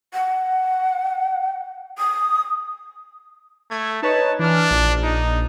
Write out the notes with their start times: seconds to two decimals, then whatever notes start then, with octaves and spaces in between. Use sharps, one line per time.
0.13 F#5
1.98 D#6
3.71 A3 G#6
4.02 D#4 B4 C#5 A5
4.39 E3 D4 F6
4.71 A#1
5.03 D#4